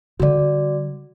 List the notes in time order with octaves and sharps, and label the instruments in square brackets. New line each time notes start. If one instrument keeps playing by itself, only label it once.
[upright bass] D3 G3 [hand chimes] F#4 D5